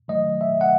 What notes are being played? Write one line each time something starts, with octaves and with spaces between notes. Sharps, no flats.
D#3 F#3 A3 D#5
E5
F#5